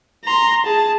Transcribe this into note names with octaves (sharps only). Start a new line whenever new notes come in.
A#5 C6
G#4 A5